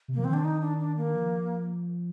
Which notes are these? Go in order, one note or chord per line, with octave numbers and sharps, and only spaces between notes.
C3
F3 A#3
D#3 C4
D4
D#4
D4
D4
A#3
F3